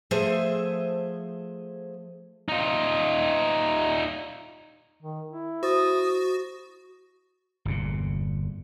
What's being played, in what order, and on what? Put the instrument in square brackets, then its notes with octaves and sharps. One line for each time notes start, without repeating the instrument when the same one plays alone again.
[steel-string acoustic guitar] F3 A3 G#4 C5 E5
[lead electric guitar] D#4 F4
[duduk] D#3
E4
[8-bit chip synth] F#4 [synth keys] C5 A6 [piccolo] D#6
[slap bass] G1 E2 A#2